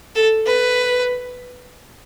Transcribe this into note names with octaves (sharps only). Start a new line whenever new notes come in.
A4
B4